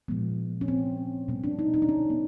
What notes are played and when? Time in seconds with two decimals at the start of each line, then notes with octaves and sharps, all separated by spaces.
0.08 A#2 F3 G#3 B3
0.61 C#4
0.68 C4
1.28 B2 G3 B3 C#4
1.44 D4
1.59 D#4
1.74 D#4
1.82 D4
1.89 C#4
2.10 B3